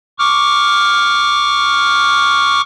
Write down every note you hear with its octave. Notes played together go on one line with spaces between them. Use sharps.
C#6 D6 F6